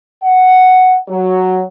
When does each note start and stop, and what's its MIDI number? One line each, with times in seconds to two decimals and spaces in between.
0.23 0.97 78
1.08 1.63 54